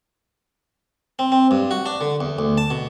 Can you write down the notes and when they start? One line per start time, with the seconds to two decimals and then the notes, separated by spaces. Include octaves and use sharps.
1.19 C4
1.32 C4
1.51 G2
1.71 F#4
1.86 D4
2.01 D3
2.21 E2
2.39 D2
2.58 A5
2.71 B2